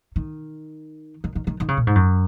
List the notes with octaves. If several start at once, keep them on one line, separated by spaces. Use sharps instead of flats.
D#3
D#3
D#3
D#3
D#3
C#3
A#2
G#2
F#2